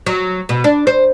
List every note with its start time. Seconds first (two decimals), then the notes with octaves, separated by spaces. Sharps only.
0.06 F#3
0.49 B2
0.64 D4
0.87 C5